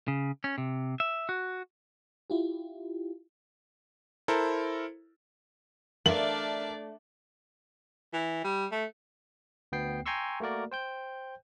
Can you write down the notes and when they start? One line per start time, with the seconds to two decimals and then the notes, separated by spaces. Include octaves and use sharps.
0.08 C#3
0.44 C#4
0.58 C3
1.00 E5
1.29 F#4
2.30 E4 F4 G4
4.28 E4 A4 A#4 C5
6.06 A3 D4 A#4 D5 E5 F5 F#7
8.13 E3
8.44 G3
8.72 A3
9.72 D2 B3 G5 C7
10.06 G5 G#5 A#5 C6 C#6 E6
10.40 A3 A#3 F#4 A#4 D5
10.71 C5 G5 G6